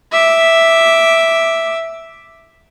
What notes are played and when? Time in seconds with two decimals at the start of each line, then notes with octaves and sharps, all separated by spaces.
0.12 E5 D6